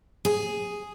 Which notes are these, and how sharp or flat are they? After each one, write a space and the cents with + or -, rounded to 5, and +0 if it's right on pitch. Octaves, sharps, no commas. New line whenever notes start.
G#4 +0